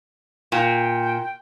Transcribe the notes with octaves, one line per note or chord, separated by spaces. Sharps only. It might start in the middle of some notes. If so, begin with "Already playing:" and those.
A#2 G5